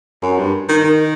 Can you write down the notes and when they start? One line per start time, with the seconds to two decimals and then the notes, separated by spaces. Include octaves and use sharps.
0.23 F#2
0.38 G2
0.69 D#3
0.84 D#3